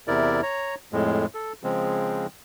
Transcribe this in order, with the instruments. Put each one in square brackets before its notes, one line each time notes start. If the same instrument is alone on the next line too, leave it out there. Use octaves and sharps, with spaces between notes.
[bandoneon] E2 C3 E4 A#4 D5
C#5 A#5
F2 A2 G#3
A4
C#3 F3 G#3 C4